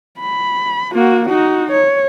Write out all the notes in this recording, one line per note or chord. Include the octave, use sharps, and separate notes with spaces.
B5
A#3 F#4
D#4 F#4
C#5